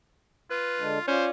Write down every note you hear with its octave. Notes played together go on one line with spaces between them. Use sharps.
F4 B4
D3 G#3 D4
C#4 F4 C5 D5